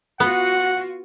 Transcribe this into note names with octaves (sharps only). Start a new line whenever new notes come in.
B3 F4 F#4 F#5